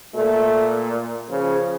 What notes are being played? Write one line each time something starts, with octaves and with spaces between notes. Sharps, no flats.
A#2 A3
C#3 F3